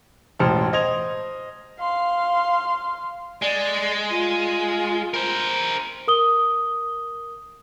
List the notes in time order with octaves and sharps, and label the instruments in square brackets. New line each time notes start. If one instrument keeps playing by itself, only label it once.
[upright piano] E1 A1 C5 A5 F6
C5 D#5 G#6 F7
[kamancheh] F5 C6
[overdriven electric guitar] G#3 [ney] D5
[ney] F4
[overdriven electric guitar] A#4 C5
[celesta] A#4 D#6 G7